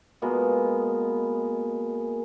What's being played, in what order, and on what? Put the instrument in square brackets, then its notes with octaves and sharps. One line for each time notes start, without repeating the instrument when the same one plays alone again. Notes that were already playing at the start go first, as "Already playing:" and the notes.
[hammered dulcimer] B2 G#3 A#3 B3